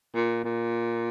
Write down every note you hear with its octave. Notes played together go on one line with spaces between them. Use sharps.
A#2
A#2